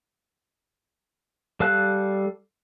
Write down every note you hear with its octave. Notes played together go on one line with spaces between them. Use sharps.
G3 A4 F5 A5 F#6